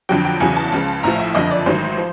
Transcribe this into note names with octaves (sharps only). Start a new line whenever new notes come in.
F2 D3 F#3 G5
G5
E2 C#3 F#3 G#5
A5
C#2 C#3 F3
A#1 A2 F3 A#5
E5
F#1 F2 D3 D#5
D5
A1 G#2 D#3 F#3 C5
F3